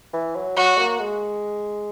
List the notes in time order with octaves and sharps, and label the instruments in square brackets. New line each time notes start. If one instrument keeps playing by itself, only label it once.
[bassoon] E3
F#3
[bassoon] F#3 [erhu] F#4
[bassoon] A#3
G#3